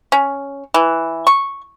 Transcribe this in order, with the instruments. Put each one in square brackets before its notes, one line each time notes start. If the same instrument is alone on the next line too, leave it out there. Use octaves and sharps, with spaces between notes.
[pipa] C#4
E3
C#6